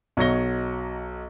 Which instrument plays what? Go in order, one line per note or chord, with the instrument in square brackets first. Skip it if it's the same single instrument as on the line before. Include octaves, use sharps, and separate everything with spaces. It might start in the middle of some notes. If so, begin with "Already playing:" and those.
[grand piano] B1 F#3 C#5 D#5 A#6 G7